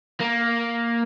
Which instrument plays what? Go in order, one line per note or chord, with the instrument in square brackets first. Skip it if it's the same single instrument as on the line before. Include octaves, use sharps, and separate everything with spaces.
[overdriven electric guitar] A#3